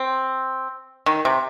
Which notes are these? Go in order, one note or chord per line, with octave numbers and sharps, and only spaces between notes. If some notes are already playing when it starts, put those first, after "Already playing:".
Already playing: C4
D#3
C3